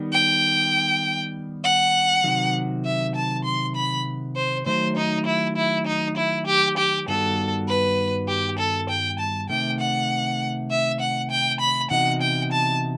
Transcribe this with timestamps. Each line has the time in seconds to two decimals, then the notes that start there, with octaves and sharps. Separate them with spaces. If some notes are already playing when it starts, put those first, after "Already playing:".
Already playing: D#3 G3 B3
0.12 G5
1.64 F#5
2.24 C3 D#3 F#3
2.85 E5
3.16 A5
3.45 C6
3.75 B5
4.36 C5
4.66 D#3 F#3 A3 C5
4.97 D#4
5.26 E4
5.56 E4
5.87 D#4
6.17 E4
6.47 G4
6.77 G4
7.08 G2 D#3 G3 B3 F#4 A4
7.69 B4
8.28 G4
8.59 A4
8.90 G5
9.19 A5
9.49 C3 D#3 A3 G5
9.80 F#5
10.70 E5
11.00 F#5
11.31 G5
11.60 B5
11.91 C3 E3 B3 D#4 F#4 F#5
12.22 G5
12.52 A5